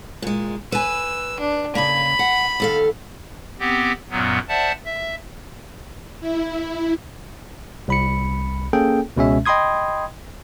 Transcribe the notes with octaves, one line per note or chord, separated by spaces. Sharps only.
A#2 G#3
B4 G#5 E6
D4
C#3 A#3 B5
F#5
D#2 A4 F5
B3 C4 G4
F#2 A#2 F#3 B3
C5 D5 E5 F#5 A5
E5
E4
C2 B5 C#7
A#3 C#4 G#4 A4 G5
C#2 B2 G#3 C#4 E5
D#5 G5 B5 C6 D#6 G#6